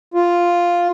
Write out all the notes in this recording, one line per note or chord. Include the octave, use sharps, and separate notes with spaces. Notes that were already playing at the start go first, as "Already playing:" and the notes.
F4